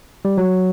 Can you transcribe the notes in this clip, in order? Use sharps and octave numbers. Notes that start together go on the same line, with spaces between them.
G3
F#3